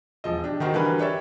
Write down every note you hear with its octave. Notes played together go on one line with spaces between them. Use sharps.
E1 F3 D#5
D4 G4
D#3 D#4 F#4 A#4 C5
D3 E3 G3 F#4 A#4 B4
G4 C#5 D5 E5